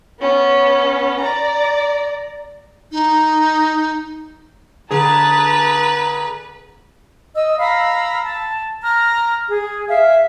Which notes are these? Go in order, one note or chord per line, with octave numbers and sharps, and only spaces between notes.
B3 C#4
D5 A#5
D#4
D3 G#4 B4 A5 A#5 A6
D#5 E6
F5 A#5 B5 E6
A5
A#5 F6
G#4
E5 F5